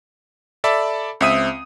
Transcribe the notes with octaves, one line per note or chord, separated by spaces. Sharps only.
A4 D5 E5 A5 B5
C#2 C4 E5 D#6 D#7